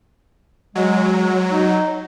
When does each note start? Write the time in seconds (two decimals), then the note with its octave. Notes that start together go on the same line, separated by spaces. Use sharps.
0.75 F#3 G#3
1.51 D#4